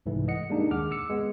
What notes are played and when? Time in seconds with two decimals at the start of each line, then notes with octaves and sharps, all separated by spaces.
0.06 C2 G#2 E3 A3
0.28 D#5 F#5 C#7
0.50 G3 G#3 A#3 D4 D#4
0.71 D#2 G#4 F#5 D6 F6
0.91 D6 E6 C#7
1.10 G#3 B3